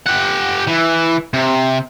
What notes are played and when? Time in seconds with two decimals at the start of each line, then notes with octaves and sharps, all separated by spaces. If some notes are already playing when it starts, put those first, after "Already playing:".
0.07 G4 F#5
0.68 E3
1.33 C3